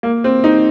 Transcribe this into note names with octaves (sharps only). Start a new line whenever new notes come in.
A#3
C4
D#4